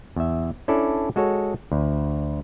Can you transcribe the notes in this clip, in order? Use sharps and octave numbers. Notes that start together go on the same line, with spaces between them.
E2 E5
C#4 D4 E4 A4 D5
G#3 F#4 A4 C#5
D2